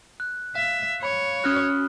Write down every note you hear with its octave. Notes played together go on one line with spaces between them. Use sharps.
F#6
E5 F5
C#5 B5
C#4 F#4 D#6 F6 F#6